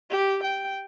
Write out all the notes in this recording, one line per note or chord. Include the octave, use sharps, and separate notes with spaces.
G4
G5